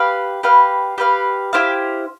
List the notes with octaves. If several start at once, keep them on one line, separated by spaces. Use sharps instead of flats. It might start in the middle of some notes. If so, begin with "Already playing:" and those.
Already playing: G4 B4 F5
G4 B4 F5
G4 B4 F5
E4 G4 C5 F5